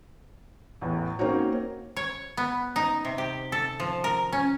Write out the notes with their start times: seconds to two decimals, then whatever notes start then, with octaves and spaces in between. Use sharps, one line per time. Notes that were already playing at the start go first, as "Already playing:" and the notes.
0.81 A1 E2
1.19 A#3 C4 C#4 D#4 F#4 C#5
1.97 C#5
2.37 B3
2.76 D#4
3.05 C3
3.18 G4
3.52 A4
3.80 F3
4.04 A#4
4.32 C#4